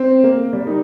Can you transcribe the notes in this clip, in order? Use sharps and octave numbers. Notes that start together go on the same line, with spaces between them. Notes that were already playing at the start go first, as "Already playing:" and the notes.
Already playing: C4
A#3
G3
D#4